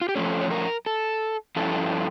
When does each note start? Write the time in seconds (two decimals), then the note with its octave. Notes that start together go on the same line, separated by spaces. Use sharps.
0.01 F4
0.09 G4
0.15 F2 C#3 F3 A3 C#4 A4
0.41 C#5
0.51 A#4
0.86 A4
1.56 G2 F3 C#4 E4 A4